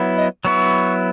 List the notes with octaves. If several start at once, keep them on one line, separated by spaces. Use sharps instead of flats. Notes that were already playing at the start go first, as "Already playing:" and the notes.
Already playing: F#3 B3 E4
D#5
F#3 B3 E4 C#6